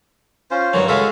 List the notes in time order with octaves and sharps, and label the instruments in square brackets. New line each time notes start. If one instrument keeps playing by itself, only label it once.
[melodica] C#4 F4 C5
[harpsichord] G2 D#3 F#3 [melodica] F#4 C#5
[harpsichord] C#3 G#3 A4 [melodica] F#4 E5 F5